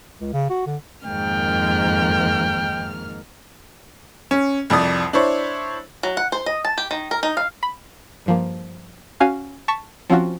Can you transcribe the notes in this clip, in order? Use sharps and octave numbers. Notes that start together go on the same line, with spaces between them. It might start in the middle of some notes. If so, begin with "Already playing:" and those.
C#2
C#3
F#4
D3
F2 G#2 D#3 A#3 G5 F6
C#4
C2 F2 D5 D#6
D4 E4 C5 C#5
F#3
F#5
C5
D#5
A5
G4
D#3
A#4
D#4
F5
B5
G2 F3 A#3
C#4 F#4 F5 G#5
A5 C#6 B6 E7
F3 C4 C#4 F4 F#4